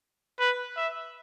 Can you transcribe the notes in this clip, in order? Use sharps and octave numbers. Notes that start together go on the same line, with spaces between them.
B4
E5